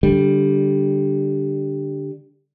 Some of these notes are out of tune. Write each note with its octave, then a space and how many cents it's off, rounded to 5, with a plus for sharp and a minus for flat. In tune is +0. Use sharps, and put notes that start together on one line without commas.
D3 -5 G3 +0